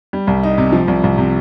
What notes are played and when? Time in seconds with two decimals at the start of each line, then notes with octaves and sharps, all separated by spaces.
0.13 G3
0.27 C2
0.43 D#4
0.58 C3
0.72 F3
0.88 C2
1.04 C2
1.18 C3